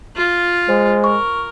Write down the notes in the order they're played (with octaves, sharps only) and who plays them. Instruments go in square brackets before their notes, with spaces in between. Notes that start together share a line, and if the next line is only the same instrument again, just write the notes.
[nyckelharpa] F4
[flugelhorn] G#3 [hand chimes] C5
[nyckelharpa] A#4 [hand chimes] C#6